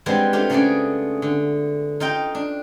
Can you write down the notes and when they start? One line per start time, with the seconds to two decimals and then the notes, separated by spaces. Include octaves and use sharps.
0.06 G3 G#3 B3 C4 D4 G4
0.33 A3 D4 F4 G4
0.50 C#3 A3 C#4 D4 G#4 D5
1.22 D3
2.00 D#4 F4 D#5 G5
2.35 D4